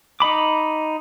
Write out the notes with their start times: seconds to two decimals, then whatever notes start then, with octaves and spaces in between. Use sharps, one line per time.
0.20 D#4 D#5 B5 D6